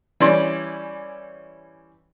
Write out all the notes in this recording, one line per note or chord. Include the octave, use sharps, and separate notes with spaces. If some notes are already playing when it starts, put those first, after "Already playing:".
E3 G3 C#4 D5 C6